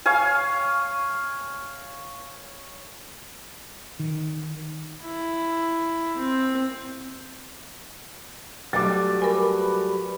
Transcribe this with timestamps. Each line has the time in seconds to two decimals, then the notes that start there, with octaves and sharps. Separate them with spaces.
0.06 C#5 F5 G#5
3.99 D#3
5.02 E4
6.17 C4
8.73 F#3 G3 A3 D6 A6
9.22 A#4 B4 G#5